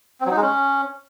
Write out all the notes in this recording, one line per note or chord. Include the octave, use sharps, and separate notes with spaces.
C4
F#3
D#4
G#3
C#4